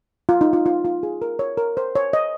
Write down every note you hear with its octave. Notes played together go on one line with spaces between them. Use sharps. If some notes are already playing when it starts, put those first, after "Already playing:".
F4
D#4
F4
F4
F4
G#4
A#4
C#5
A#4
C5
C#5
D#5